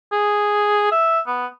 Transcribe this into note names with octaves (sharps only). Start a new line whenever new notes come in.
G#4
E5
B3